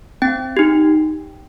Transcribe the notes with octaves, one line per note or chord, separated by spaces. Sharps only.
C4 G5
D#4 G4